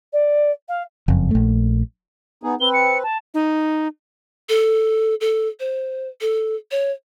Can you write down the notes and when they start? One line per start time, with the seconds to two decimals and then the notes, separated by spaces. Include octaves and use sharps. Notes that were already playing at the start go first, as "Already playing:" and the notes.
0.12 D5
0.68 F5
1.08 F#1 F2
1.31 A#1 A3
2.43 B3 D#4 G#4
2.61 C4 B4 G7
2.74 C#7
3.03 A5
3.34 D#4
4.49 A4
5.21 A4
5.60 C5
6.21 A4
6.71 C#5